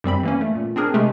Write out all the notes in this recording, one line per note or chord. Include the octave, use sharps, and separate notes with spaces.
F#2 G3 C4 B5
E3 A#3 C#4
A3
A#2
C4 D4 G#4 A#4
C3 G#3 A3